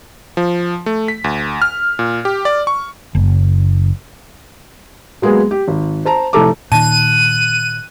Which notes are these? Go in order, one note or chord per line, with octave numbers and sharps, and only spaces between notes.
F3
A3
B6
D2
F6
A#2
G4
D5
C#6
F#1
F#3 G#3 A#3 B3 G#4
G4
G#1
C5 A5 A#5
F1 A2 A3 A4 A#5 D6
A#2 D#3 A5 F#6 D#7